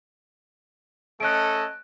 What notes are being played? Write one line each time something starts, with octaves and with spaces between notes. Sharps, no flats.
A3 C#4 A4 D#5 F#6 D7